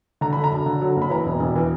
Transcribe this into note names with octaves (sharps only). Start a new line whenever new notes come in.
D3 A#5
D3 B5
A#5
F#2
D3
F#3
F#1
B5
E3 A#5
E1
E1
E3